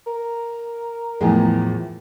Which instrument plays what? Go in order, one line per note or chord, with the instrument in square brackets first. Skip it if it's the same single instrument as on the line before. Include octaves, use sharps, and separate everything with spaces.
[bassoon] A#4
[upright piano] E2 E3 G#3 [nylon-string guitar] A2 F3